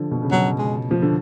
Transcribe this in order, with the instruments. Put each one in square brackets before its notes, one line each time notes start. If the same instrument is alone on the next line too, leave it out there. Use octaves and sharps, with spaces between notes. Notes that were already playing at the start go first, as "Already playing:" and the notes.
Already playing: [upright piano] D3 F3
B2
C#3
[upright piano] B2 [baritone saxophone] F#3
[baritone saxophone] G#3
A3
[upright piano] F3
D3